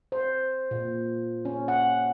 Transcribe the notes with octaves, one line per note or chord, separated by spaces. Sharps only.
C5
A#2
C#4
F#5